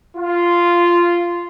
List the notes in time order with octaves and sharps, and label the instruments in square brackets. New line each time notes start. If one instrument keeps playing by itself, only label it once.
[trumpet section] F4